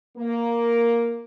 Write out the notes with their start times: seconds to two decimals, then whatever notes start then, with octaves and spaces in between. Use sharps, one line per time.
0.17 A#3